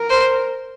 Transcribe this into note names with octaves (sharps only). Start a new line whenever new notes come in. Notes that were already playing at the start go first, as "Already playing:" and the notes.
Already playing: A#4
C5